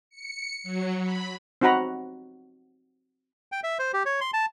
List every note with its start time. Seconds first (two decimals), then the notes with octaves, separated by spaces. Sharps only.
0.10 C#7
0.63 F#3
1.02 B5
1.61 C4 D#4 F#4 F#5 A#5 B5
3.52 G5
3.63 E5
3.79 C5
3.94 G4
4.06 C#5
4.21 C6
4.33 A5